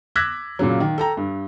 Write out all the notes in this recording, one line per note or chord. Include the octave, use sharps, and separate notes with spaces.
D6 E6 F#6 G#6 A#6 B6
A#2 C#3 F#3
D#3
A4 G5 A#5
G2